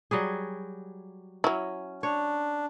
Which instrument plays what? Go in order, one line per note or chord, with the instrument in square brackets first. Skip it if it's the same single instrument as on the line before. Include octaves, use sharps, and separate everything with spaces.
[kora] F#3 G3 G#4
[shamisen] F#3 E4 [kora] C#4
[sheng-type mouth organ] D4 [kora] C#5